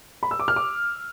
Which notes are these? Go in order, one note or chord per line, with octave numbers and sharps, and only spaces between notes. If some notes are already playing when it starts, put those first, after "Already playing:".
B5
E6
D6
F6
D6